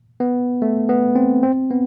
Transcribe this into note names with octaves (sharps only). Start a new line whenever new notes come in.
B3
A3
B3
C4
C4
B3